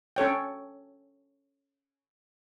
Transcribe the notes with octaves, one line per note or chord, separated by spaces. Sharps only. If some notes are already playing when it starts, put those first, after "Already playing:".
C#4 A4 C#5 G5